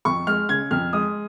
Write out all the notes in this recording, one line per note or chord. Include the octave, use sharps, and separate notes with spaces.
F2 C#6
G#3 F6
C#3 G#6
F2 F6
G#3 D#6